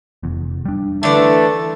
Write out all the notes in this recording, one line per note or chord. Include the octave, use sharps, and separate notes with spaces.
F1 E2
G3 D4
D3 E3 A3 D5